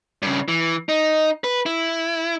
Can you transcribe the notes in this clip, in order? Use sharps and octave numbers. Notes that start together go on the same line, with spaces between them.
G2 C#3
E3
D#4
B4
E4